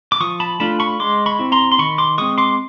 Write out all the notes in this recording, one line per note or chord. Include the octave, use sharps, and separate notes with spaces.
D6
F3 C#6 D#6
A5 B5
A3 D4 F4 A5 B5
B5 C#6
G#3 C6 D6
B5 C#6
C4 E4
A#5 C6
C6
D#3 B5 C#6
C6 D6
G#3 C4 C#6 D#6
C6 D6